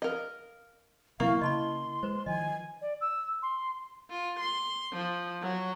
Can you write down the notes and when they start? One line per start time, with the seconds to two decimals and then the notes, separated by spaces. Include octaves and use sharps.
0.02 A#4 D#5 F5
1.20 C3 F#3 A#3 C4 E4 E5 F5 C#6
1.41 C#3 D#5 A5 B5 C6
2.03 G#3 B4 C5
2.26 D#3 F3 D#5 G#5
2.81 D5
3.01 E6
3.42 C6
4.10 F4
4.40 C6
4.93 F3
5.42 F#3